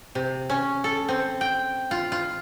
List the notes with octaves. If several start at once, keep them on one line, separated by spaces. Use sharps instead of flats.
C3
C#4
A4
C4
G5
F4
F4